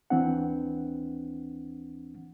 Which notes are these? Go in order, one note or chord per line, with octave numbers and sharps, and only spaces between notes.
D#2 E3 C4 D4 F#5